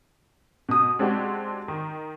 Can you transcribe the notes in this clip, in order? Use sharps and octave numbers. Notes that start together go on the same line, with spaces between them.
B2 D#6
G#3 C4 D4 F#4 G4
D#3